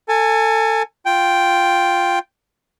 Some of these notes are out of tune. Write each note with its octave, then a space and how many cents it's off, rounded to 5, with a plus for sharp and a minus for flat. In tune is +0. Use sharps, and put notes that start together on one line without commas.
A4 +25 G#5 +0
F4 +0 G5 +0